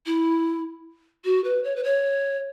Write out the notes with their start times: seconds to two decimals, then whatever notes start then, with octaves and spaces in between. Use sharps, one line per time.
0.06 E4
1.25 F#4
1.44 B4
1.64 C#5
1.76 B4
1.84 C#5